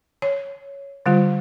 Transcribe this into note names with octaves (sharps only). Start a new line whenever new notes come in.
C#5
D3 G3 F4